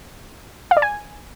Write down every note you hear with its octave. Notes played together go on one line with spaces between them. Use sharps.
F5
D5
G#5